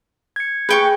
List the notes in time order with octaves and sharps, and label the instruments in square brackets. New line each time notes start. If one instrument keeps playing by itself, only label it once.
[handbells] G#6 C#7
[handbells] G#4 G6 [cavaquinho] B4 G5 C#6